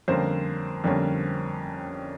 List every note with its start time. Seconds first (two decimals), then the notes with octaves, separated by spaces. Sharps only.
0.08 F2 D3 G3 A#3 C#4 C5
0.84 F2 D3 G3 A#3 C#4